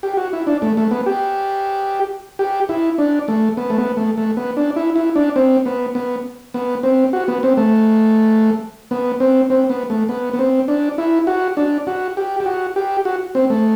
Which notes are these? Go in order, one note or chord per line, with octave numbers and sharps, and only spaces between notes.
G4
F#4
E4
D4
A3
A3
B3
G4
G4
E4
D4
A3
B3
A3
B3
A3
A3
B3
D4
E4
E4
D4
C4
B3
B3
B3
C4
F#4
B3
C4
A3
B3
C4
C4
B3
A3
B3
B3
C4
D4
E4
F#4
D4
F#4
G4
G4
F#4
G4
F#4
C4
A3